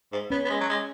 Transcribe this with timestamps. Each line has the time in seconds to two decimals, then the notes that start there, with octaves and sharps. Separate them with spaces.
0.12 G#2
0.30 B3 C#4
0.45 B3
0.50 G#3
0.60 F#3
0.69 G#3